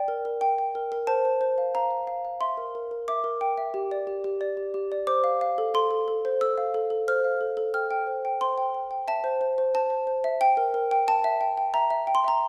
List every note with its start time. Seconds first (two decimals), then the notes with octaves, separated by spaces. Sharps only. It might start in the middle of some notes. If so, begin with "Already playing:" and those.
Already playing: D5 G5
0.08 A#4
0.25 A#4
0.41 G5
0.58 G5
0.75 A#4
0.92 A#4
1.07 C5 A5
1.25 C5
1.41 C5
1.58 F5
1.75 F5 A#5
1.91 F5
2.07 F5
2.25 F5
2.41 E5 C6
2.57 A#4
2.75 A#4
2.91 A#4
3.08 E5 D6
3.24 A#4
3.41 G5
3.58 E5
3.74 G4
3.91 D5
4.07 G4
4.24 G4
4.41 D5
4.57 G4
4.74 G4
4.92 D5
5.07 C5 D6
5.24 F5
5.41 F5
5.58 A4
5.74 A4 C6
5.91 A4
6.08 A4
6.25 C5
6.41 A4 E6
6.58 F5
6.74 A4
6.90 A4
7.08 C5 F6
7.25 F5
7.41 A4
7.57 A4
7.74 G5 F6
7.91 G5
8.07 C5
8.25 G5
8.41 C5 C6
8.58 G5
8.75 G5
8.91 G5
9.08 E5 A5
9.24 C5
9.41 C5
9.58 C5
9.74 C5 A5
9.90 C5
10.07 C5
10.24 E5
10.41 G5
10.57 A#4
10.74 A#4
10.91 G5
11.08 G5 A5
11.24 E5
11.41 G5
11.58 G5
11.74 E5 A#5
11.90 E5
12.07 G5
12.15 C6
12.24 E5 A#5